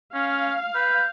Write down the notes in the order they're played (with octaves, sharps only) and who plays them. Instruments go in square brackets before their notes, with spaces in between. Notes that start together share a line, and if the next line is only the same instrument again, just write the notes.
[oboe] C#4 [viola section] F5
[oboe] B4 [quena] G6